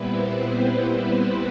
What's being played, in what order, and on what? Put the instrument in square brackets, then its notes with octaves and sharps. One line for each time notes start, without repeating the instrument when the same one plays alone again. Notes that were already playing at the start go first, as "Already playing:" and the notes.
Already playing: [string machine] A#2 G3 B3 C4 E4 B4
C4 C5